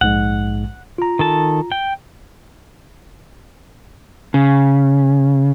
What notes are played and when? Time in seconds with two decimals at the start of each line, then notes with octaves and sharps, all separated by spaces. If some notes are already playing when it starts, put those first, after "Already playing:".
0.01 A#1 G#2 G#3 F#5
0.98 F4 A#5
1.19 D#3 A4 A5
1.72 G5
4.34 C#3